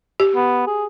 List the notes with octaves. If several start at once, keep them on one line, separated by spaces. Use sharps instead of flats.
G4
B3
G#4